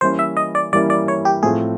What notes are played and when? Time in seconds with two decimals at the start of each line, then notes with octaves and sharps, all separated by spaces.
0.01 E3 G3 A#3 C#4 E4 C5
0.19 E5
0.37 D#5
0.55 D5
0.73 E3 G3 A#3 C#4 E4 D5
0.90 D5
1.08 C#5
1.25 G4
1.43 A2 F3 A3 C4 F4 G#4